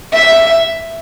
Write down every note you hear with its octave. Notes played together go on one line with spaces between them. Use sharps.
E5